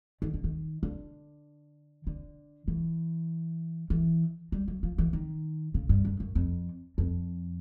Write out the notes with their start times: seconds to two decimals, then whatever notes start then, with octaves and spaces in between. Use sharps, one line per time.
0.22 D#3
0.34 D3
0.44 D#3
0.83 D3
2.07 D3
2.68 E3
3.90 E3
4.52 G3
4.68 F#3
4.83 F3
4.98 E3
5.13 D#3
5.74 C#3
5.89 G2
6.05 F#2
6.20 F#2
6.35 F2
6.98 F2